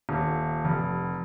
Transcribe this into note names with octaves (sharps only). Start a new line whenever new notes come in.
D#1
F1